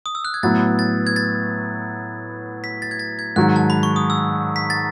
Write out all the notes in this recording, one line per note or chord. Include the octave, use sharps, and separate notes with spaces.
D#6
E6
F#6
G#6
A2 F#3 B3 A6
A6
G#6
A6
B6
A6
G#6
A6
G#6
G#2 D#3 F#3 F#6
A5
B5
C#6
D#6
E6
B6
A6